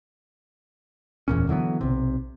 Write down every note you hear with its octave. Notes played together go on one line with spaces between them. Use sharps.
D1 E2 A#2 C#4
D3 E3 F#3 B3
B1 C3